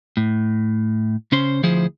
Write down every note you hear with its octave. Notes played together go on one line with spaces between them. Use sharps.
A2
C#3 C#4 C5 C6
D2 F3 E4 G#4 C5